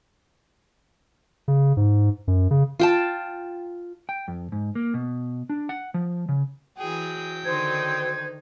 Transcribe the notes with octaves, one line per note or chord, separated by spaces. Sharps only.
C#3
G#2
F#2
C#3
F4 G5 A5
G5
F2
G#2
A#3
B2
D4
F#5
F3
C#3
E3 F#3 G#4 G5
D3 D#3 D#4 C5 G#6